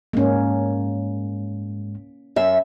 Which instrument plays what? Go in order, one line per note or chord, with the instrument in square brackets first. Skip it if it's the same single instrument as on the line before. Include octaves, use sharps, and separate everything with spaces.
[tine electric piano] G#2 G#3 [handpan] A#3 C#4
[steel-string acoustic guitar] F#2 E5